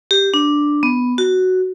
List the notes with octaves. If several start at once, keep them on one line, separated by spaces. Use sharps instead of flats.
G4
D4
B3
F#4